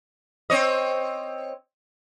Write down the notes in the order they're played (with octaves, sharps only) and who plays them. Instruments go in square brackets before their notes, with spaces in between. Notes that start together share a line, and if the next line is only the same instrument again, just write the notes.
[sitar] C4 C#5 D#5